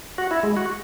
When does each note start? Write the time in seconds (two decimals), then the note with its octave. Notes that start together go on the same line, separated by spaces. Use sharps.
0.18 F#4
0.31 E4
0.43 G#3
0.56 F#4